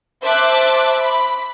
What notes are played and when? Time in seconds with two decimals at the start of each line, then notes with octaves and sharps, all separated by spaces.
0.22 C5 E5 A5 D6 F#6
0.90 B5